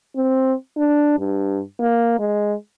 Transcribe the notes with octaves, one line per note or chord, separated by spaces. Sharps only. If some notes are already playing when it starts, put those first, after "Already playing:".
C4
D4
G2
A#3
G#3